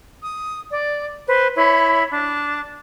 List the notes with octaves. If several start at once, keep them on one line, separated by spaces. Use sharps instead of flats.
D#6
D5
B4 C5
E4 C#5 B5
D4